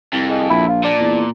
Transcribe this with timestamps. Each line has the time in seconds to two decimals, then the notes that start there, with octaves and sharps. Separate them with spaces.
0.13 C2 F2
0.29 G#3
0.50 A#1 E4
0.68 F4
0.84 A#2 D4
1.00 E2